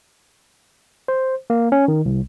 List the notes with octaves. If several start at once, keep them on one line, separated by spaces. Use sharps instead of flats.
C5
A#3
C#4
D#3
C2